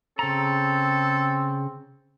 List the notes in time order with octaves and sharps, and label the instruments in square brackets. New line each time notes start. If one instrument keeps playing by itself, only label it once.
[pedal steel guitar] C#3 A#5 [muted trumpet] C4 [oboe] A4